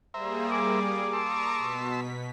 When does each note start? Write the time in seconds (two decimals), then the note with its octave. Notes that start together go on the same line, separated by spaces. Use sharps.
0.14 G3 A#3 G#4 C5 E5 A#5
0.52 D6
1.13 A5 A#5 C6 C#6 D#6 E6
1.55 B2 B6